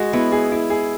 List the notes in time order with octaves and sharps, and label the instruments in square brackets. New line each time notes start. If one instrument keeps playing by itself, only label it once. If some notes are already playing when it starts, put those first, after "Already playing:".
Already playing: [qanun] G#3 [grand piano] F#4
[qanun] B3 [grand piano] E4
[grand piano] G#4
E4
G#4